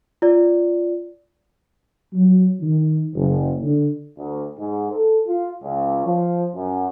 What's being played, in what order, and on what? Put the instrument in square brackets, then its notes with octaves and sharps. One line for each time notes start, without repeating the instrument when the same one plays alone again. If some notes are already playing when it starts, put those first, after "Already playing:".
[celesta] F4 D5
[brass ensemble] F#3
D#3
F#1
D3
D2
G#2
A4
F4
C#2
F3
F#2